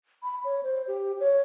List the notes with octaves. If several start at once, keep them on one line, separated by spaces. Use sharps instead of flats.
B5
C#5
C5
G4
C#5